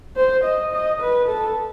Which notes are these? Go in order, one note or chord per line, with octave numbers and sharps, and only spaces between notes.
C5
D#5
D#5
B4
A4